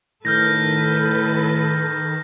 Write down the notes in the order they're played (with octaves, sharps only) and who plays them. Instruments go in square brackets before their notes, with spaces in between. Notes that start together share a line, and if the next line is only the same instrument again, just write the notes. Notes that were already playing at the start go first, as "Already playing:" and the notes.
[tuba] A2 [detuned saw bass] D#3 [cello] A4 B4 [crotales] F6 G6 A#6